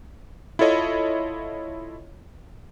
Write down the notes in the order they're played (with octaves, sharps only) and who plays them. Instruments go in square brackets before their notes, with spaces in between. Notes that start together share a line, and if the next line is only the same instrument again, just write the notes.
[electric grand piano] E4 F4 A4 C#5 D#5